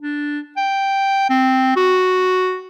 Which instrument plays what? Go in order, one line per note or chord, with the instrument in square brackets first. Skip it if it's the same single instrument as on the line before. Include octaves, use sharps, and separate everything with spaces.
[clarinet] D4
G5
C4
F#4